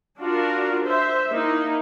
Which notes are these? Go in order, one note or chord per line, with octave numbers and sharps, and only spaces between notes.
D4 F4 F#4 A#4
C5 E5
A#3 D#4 E4